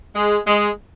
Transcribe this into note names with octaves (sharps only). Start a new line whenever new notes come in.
G#3
G#3